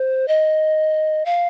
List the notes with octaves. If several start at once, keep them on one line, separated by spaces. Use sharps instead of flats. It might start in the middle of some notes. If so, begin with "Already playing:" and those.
Already playing: C5
D#5
F5